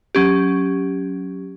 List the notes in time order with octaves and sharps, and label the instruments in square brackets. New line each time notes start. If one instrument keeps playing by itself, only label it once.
[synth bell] F#3 C#4 G4